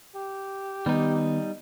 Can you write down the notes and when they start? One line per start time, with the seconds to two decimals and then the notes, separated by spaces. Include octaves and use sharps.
0.15 G4
0.86 D#3 G3 B3 D#4